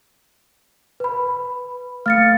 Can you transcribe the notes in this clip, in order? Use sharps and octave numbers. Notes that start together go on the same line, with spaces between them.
B4 B5
A3 F5 F6 A6 C#7